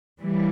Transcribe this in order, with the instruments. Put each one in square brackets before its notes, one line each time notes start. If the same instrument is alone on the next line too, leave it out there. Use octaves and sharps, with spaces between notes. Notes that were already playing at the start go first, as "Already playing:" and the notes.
[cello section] E3 G3